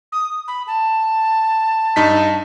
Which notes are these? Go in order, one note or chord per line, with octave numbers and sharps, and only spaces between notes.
D#6
B5
A5
G2 D#4 B6